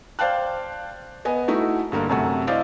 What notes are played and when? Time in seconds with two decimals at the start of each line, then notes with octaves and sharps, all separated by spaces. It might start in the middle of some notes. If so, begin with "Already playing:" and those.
0.19 C5 D5 F5 G5 A5 F#6
1.25 B3 D#5 G#5
1.48 A3 D#4 E4 F#4
1.92 G2 D3 A#3
2.09 F#2 C3 A3 F#5
2.47 E4 C5 D5 D#5 F5